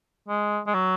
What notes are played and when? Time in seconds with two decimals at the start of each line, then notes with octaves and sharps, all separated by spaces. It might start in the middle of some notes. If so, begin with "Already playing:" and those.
0.28 G#3
0.67 G#3
0.74 F#3